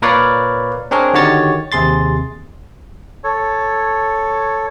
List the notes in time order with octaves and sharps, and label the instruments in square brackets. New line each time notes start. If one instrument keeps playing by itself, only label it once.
[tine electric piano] A#2 A#4 B4 C#5 D5 F5
C4 D4 G#4 A#4 C#5
D3 D#3 F#4 G4 C#5 A6
D#2 C3 G#4 C6 A6
[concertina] A4 C#5